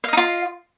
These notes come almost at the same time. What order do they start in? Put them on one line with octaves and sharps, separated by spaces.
F5 D#5 D#4 F4